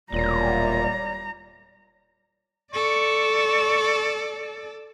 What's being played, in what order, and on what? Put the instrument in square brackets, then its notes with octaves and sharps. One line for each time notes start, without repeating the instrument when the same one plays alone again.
[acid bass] E1 [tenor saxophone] A#2 [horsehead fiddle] G3 A#5 [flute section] C#5 D5
[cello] A4 D5 [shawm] C#6